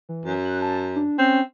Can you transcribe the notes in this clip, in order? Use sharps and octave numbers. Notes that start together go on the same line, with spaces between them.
E3
F#2
F#6
A5
D4
C4 C#4